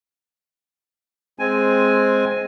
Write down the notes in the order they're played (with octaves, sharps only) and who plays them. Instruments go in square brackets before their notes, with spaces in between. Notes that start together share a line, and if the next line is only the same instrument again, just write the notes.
[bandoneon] G#3 C4 G#5